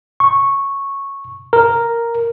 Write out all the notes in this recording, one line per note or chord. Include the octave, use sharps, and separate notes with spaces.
C#6
A#4